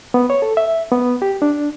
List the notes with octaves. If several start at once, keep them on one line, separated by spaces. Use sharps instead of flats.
B3
C#5
A4
E5
B3
G4
D4